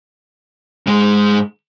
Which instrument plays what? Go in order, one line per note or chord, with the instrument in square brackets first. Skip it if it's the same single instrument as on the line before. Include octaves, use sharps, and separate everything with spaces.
[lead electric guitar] G#2 G#3